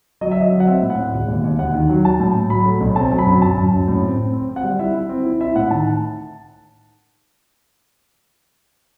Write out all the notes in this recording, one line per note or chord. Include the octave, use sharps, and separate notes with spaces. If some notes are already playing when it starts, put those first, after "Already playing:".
F#3 D#5
E5
F#3 D#5
F#3
F#5
C4 E5
A2
F#5
A2
E1
D#2
D#2
D#2 F#5
D#3
F#3
F#3 A5
A2
A2
F#3 B5
A3
B1
C4 A5
F#3
B5
F#2
F#2 A5
F#2
F#2
A2
C4
C4
C4
C4
F#5
G3
E4 E5
E4
C4
E4
E4 E5
A2 F#5
D#3 A5